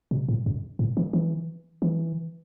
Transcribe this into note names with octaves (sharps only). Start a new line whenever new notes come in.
B2
A2
F#2
A2
E3
E3
E3